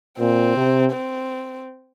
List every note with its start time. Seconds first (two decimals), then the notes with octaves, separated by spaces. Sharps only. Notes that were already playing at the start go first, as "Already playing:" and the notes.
0.19 A#2 C4
0.56 C3
0.92 C4